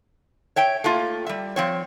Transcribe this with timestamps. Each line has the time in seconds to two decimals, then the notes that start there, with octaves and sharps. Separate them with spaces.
0.56 C#5 E5 G5
0.84 A3 A#3 F4
1.27 G3 E5
1.56 F3 C4 C#5